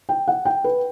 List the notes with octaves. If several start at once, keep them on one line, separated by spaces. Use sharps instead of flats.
G5
F#5
G5
B4